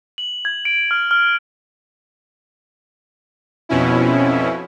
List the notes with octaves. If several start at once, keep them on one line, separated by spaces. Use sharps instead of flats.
F#7
G#6
D7
F6
F6
F2 B2 C#4 E4